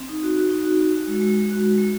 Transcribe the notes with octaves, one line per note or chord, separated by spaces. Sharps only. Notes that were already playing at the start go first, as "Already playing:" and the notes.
Already playing: C4
D#4
F#4
F#4
D#4
F#4
F#4
F#4
G#3
G#3
G#3
F#4
F#4
G#3